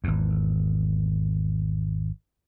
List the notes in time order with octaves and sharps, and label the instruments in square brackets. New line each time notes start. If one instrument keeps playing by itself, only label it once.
[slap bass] G#1 E2